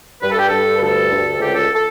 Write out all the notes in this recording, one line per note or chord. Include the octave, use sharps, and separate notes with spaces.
G2 B4
A4
G4
G2 A4
B4
D2 A4
D2
C#2 G4
A4
A4